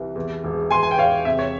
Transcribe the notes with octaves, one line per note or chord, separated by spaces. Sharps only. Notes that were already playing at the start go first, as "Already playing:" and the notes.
Already playing: C2 E3
E2
E1
E1 G#5 C6
G#5
G5
E1 C#5 F5
C3 E5
C#5